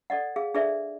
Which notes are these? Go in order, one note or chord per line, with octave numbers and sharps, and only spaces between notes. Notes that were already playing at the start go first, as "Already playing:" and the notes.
A4 D5 D#5 F#5
G#4 F5
D4 G#4 A4 B4 D5 E5